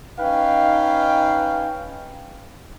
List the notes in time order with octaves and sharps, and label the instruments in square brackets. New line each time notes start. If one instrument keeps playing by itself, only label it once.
[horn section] C#4 D#4 B4 F5 G5